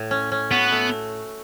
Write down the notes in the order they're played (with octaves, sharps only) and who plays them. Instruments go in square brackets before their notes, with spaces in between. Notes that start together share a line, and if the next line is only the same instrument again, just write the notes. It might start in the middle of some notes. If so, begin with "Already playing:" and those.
Already playing: [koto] A2
C#4
C#4
[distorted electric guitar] B3 [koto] F#4
[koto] A3